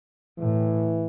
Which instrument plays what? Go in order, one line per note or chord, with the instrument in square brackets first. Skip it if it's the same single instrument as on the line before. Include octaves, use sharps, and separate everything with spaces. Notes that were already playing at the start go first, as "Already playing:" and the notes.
[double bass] A2 [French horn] E3